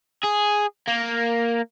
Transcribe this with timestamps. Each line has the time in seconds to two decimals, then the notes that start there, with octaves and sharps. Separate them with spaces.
0.24 G#4
0.87 A#3